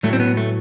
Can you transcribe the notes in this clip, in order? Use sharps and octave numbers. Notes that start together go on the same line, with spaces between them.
A2 F#3 A3
C4
B3
A3